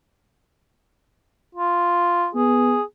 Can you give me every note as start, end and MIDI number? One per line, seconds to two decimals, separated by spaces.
1.55 2.28 65
2.35 2.77 59
2.35 2.83 68